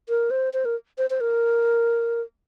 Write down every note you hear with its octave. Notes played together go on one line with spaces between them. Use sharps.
A#4
C5
C5
A#4
C5
C5
A#4